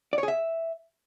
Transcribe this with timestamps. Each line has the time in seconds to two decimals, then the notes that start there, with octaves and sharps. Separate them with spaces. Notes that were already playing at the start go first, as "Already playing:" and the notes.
0.13 D5
0.18 C#5
0.23 G#4
0.28 E5